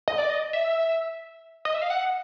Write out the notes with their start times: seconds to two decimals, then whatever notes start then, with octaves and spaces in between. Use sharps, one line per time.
0.08 D#5
0.18 D5
0.30 D#5
0.53 E5
1.65 D#5
1.74 E5
1.82 F5
1.90 F#5